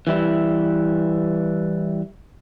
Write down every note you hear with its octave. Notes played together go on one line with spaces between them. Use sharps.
E3 G3 E4